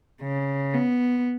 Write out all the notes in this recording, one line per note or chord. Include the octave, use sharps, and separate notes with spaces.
C#3
B3